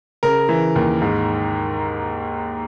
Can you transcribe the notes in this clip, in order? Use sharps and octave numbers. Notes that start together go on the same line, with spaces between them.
C#3 A#4
E3
D#2
G#2